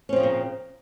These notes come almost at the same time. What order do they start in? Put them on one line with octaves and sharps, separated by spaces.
C#4 C4 F3 C#3 A#2